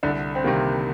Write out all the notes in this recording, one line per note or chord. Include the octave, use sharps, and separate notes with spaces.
C2 D3 D4
C4
C3 D#3 G3 A#3